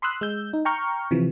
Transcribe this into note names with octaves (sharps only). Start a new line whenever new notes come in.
B5 C6 D#6 E6 F#6
G#3 E6 G6
D#4
G5 A#5 C#6 F6 G6
C3 E3 F3